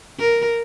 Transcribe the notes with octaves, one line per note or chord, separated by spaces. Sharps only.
A#4